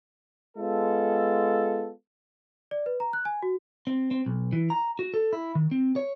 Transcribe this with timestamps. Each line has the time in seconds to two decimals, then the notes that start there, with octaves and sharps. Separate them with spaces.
0.57 G#3 B3 F4 A4
2.71 D5
2.86 B4
3.00 A#5
3.13 F#6
3.25 G#5
3.43 F#4
3.87 C4
4.11 C4
4.26 B1
4.53 E3
4.70 A#5
4.99 F#4
5.14 A4
5.33 E4
5.55 D#3
5.71 C4
5.96 C#5